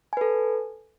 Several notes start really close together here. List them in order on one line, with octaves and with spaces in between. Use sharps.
G#5 B4 A4